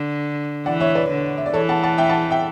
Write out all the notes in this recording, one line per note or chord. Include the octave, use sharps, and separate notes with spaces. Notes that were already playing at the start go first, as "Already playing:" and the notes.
Already playing: D3
E3 D5 F#5
C#5 E5
B4 D5
D3
E5
D5
E3 A4 C#5
F#5 A5
F#5 A5
E5 G5
F#5 A5
E5 G5